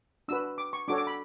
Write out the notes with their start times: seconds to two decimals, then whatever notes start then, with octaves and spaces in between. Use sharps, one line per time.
0.28 D4 F#4 B4 E6
0.58 D6
0.73 C#6
0.88 D4 F#4 A4 C#5 D6
0.98 D6
1.07 B5